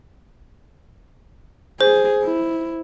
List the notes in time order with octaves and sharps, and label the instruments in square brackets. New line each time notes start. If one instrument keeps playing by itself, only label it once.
[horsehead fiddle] G#4 [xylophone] C5
[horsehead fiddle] E4